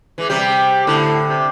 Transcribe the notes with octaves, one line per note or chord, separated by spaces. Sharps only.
E3 G#3
C3 G3 G4
A2 D3
C3